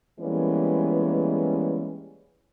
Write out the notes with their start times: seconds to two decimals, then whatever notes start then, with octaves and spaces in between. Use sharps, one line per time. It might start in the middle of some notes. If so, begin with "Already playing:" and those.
0.20 E3 G3 G#3 A#3 B3 C#4